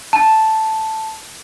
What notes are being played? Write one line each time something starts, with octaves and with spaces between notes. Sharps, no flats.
A5